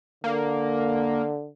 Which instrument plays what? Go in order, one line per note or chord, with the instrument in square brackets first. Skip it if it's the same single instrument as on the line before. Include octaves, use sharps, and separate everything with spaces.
[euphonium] D3 [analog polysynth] A#3